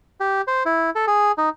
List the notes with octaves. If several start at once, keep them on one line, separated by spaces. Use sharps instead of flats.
G4
C5
E4
A4
G#4
D#4